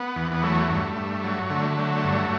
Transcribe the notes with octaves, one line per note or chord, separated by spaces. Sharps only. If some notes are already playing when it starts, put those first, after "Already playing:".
Already playing: B3
E2
B3
F#3 A3
G2
G2
F#3
D3 A3
F#3
G2